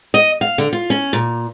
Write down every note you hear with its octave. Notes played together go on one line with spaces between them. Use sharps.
D#5
F5
D3
F4
C#4
A#2